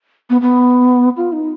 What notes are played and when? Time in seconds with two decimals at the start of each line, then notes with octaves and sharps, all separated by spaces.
0.30 B3
0.41 B3
1.17 F4
1.32 D#4